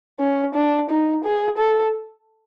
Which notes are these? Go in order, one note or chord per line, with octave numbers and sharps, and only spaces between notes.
C#4
D4
D#4
G#4
A4